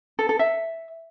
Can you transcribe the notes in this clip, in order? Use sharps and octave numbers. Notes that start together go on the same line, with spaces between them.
A4
A4
E5